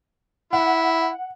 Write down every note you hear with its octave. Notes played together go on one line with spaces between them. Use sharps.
E4 F#5